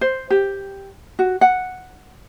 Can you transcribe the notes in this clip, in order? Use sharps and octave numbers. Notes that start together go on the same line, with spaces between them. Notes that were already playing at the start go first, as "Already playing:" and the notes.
C5
G4
F#4
F#5